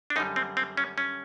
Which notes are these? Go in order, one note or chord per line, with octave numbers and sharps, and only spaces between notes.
D4
F#2 D3 G3 D#4
C4
C4
C#4
C#4